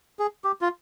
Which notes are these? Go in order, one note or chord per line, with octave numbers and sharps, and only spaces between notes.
G#4
G4
F4